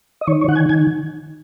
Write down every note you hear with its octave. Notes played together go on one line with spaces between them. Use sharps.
D#5
D#3 C#5
C#5
D#3 F#5
G#5
D#3 G#5